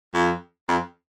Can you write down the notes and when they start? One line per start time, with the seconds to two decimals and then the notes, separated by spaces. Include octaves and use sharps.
0.14 F2
0.69 F2